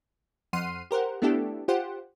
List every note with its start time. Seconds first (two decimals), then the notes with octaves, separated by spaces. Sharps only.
0.53 F2 F#5 C6 F6 C7 D#7
0.91 G4 A#4 C5 F#5
1.22 A3 B3 D4 E4 G4 A4
1.68 F4 G4 C5 F#5